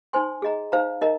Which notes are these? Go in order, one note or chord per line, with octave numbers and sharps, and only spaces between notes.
D#4 C5 G#5 C6
G#4 D#5 A#5
D#4 C5 F5 A#5
D#4 A#4 D#5 A#5